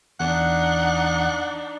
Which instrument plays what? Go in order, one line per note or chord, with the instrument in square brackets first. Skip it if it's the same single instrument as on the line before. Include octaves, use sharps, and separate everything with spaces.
[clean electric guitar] E2 [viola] D4 D#4 [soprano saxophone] F#5